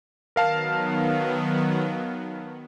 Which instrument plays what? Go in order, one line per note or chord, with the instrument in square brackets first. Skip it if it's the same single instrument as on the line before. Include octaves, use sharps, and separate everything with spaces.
[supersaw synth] D#3 F#3 B3 [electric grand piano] A#4 F5 A5